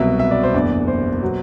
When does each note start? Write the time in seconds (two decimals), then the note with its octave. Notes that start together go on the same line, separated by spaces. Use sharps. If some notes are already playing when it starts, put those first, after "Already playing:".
Already playing: C2 B2 F#3 E5
0.19 E5
0.31 D5
0.43 C5
0.54 F#1 E2 D3 D5
0.87 C5
1.22 B2 F#3